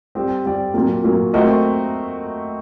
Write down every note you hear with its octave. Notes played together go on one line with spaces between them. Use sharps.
G3 C4 G4 D5
G3 C4 G4 D5
A#2 F#3 A#3
A#2 F#3 A#3
A3 C4 F#4 A#4 D#5